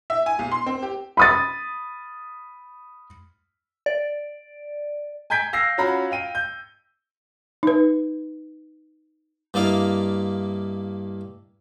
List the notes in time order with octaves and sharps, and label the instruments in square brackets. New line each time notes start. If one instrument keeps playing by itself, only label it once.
[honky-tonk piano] E5
G#5
B1
C6
C4
G4
[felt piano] B5 D#6 A6
[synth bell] D5
[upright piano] G#5 A#5 G6 G#6 B6 D7
F5 E6 A#6 C7
C#4 F4 F#4 A#5 B5
F5 G5 D#7
G6
[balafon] D#4 B4
[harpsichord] G2 A#3 E4 D5 D#5 F5